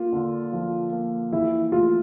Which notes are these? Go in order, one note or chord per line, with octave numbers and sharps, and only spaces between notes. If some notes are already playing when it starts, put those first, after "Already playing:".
Already playing: A#3 F4
D3
F3
A#3
E3 E4
A3 F4